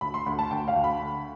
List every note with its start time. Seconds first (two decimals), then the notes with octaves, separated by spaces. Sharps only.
0.01 D2 B5
0.14 C6
0.26 D2 B5
0.39 A5
0.51 D2 G5
0.68 F5
0.76 D2
0.84 B5
1.00 D3